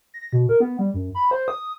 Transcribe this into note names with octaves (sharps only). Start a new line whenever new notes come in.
A#6
B2
A#4
B3
G3
F#2
B5
C5
D#6